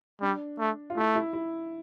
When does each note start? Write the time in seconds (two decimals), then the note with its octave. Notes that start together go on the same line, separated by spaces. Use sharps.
0.21 G3 D4
0.59 A3
0.90 F4
0.97 A3 E4
1.15 E4
1.33 E4